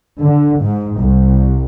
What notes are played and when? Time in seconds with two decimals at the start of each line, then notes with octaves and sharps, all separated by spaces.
0.23 D3
0.61 G#2
1.00 C2